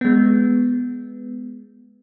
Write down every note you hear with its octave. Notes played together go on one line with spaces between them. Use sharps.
G#3 B3